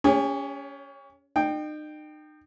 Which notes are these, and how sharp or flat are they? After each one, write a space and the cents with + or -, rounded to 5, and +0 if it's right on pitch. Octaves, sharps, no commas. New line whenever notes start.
C#4 +25 G#4 -45 C#5 -15
D#4 -40 G5 +0